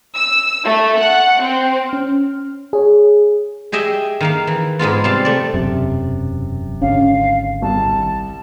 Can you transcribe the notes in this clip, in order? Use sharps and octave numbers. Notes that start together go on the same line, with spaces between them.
E6
A3
F#5
C4
C#4 F6
G#4 C#5
G4 G#4 D#5 E5 G5
D#3 A#3 F5
E3
G#2 G#3 B3 F4
C3 G3 F5 A5
A3 D5
E1 F#2 C3
G#1 D3 C#4 F5
C2 A5